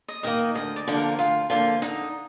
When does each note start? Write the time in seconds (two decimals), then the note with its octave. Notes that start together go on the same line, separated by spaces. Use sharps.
0.08 D#5
0.23 D#3 A#3 D#5
0.55 D2 D#5
0.76 D5
0.87 D3 F3 A#3
0.97 A#4
1.19 D2 F4
1.50 D3 F3 A#3 F4
1.82 D3 D#4